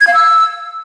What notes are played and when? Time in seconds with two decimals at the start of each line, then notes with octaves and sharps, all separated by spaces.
0.01 G#6
0.07 F5
0.14 E6